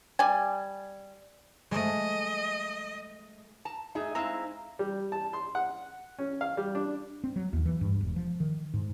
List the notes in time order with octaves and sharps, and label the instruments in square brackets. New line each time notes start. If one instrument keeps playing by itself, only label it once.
[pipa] G3 G#5
[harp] G#3 A3 [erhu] D#5
[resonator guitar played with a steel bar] A5 A#5
[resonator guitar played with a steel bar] A3 G#4 [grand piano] D#4
[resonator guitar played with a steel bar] G#3 C4 E4 [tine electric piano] F5 A#5
[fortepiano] G3
A5
C6
F#5
C#4
F5
G3
D4
[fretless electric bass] C4
F#3
D#2
E3
G2
E1
F3
D#3
G#2